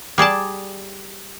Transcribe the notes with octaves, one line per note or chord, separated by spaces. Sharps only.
G3 G#4 D5 A5